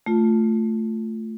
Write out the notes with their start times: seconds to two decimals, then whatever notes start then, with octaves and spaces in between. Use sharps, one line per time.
0.06 A3 F4